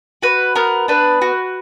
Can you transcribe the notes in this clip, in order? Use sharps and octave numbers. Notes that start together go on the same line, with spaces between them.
F#4 B4
B3 A#4
D4 B4
F#4